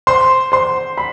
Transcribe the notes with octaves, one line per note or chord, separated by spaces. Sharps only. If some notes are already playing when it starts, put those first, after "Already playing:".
C5 C6
C5 C6
B5